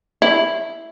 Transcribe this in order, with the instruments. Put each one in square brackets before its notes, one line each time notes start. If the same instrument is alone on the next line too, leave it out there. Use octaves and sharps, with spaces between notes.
[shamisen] E4